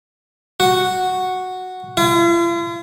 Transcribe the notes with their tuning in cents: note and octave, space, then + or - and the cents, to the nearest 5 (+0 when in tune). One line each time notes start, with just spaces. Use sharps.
F#4 -5
F4 -45